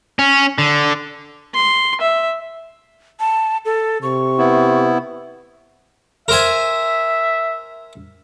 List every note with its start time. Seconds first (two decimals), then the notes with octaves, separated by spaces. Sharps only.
0.19 C#4
0.58 D3
1.54 C6
2.01 E5
3.20 A5
3.65 A4
4.02 C3 C#6
4.38 B3 E4
6.28 A#4 C5 E5 G#5